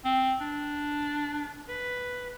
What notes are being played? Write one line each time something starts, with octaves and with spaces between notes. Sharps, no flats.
C4
D4
B4